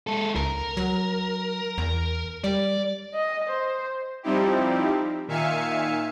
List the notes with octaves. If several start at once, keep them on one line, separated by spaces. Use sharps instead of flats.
G#3 A4
C#2 A#4
F#3
E2
G3 D5
D#5
C5
F3 G3 C4 D#4 E4 G4
A#2 D#3 E5 F5 G#5 C#7